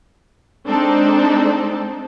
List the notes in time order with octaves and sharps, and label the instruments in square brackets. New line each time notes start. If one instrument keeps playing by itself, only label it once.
[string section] G#3 C4 D4 D#4 A4 C5